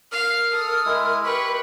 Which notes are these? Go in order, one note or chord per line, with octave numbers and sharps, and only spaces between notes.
A#4 F5 F6
A4 D#6
G#3 E4
G4 B4 B5 C#6